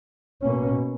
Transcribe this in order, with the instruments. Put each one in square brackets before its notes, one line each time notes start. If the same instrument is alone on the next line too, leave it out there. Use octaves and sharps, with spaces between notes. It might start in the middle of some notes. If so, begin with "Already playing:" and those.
[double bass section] B2 A#3 C#4